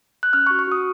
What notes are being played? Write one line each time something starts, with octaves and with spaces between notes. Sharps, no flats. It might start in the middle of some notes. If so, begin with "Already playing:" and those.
F#6
C#4 F6
C#6
F#4
C#6
F#4 D#6